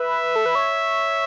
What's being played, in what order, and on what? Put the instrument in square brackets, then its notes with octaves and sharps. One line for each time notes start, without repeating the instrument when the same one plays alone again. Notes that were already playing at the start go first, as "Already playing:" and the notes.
Already playing: [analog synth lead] B4 [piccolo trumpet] E5
[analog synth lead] A4
B4
C#5